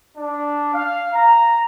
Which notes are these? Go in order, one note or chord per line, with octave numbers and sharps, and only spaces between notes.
D4
F5
A#5